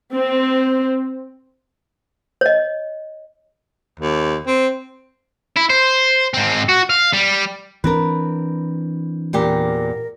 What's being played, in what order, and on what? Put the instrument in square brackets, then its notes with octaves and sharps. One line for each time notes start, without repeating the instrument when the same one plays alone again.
[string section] C4
[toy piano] C#5 D#5
[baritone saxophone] D#2
C4
[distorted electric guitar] E4
C5
G#2 C4
F#4
F5
G3
[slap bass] E3 C4 D4 [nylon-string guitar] A#4 B4
[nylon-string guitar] E2 A#2 G4 [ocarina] A#4